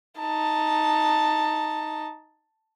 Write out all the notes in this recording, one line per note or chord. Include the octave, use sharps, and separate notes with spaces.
D#4 A5